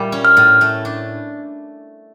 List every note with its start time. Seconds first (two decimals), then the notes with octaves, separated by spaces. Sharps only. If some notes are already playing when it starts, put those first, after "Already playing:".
Already playing: A#2 G3 E4
0.12 C#4
0.25 F6
0.37 A2
0.61 A3
0.85 D4